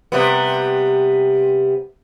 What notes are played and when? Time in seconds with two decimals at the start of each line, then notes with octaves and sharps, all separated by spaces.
0.12 C3 G3 B3